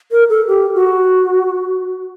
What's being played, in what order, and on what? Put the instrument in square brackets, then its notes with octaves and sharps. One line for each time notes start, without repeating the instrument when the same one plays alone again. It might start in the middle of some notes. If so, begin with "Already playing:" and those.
[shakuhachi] A#4
A4
G4
F#4